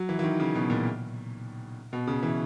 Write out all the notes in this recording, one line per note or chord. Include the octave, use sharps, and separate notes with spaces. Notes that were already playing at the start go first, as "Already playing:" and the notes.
Already playing: F#3
E3
E3
D#3
C#3
B2
A#2
B2
C#3
E3